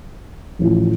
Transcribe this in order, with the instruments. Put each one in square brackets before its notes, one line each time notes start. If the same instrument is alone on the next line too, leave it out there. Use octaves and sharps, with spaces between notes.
[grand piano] A1 A2 F3